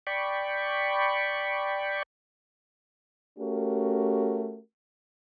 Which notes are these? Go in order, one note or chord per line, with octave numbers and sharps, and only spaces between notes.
D5 G5 B5 C#6
A3 C#4 F#4 G4 A#4